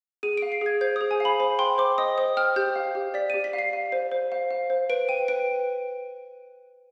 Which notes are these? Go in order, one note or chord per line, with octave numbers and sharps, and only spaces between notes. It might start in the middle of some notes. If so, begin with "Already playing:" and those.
G#4 D#7
F5 D7
C7
G#4 G#6
C5 G6
G#4 D#6
G#5
F5 B5
C5 B5
G5 C6
C5 D6
D#5 D#6
C5 D#6
G5 F6
G4 G6
F5
G4
D5 B6
G4 D#7
B6
F5
C7
F5
C5
C5
F5
F5
C5
B4 D7
G5 D#7
B4 D7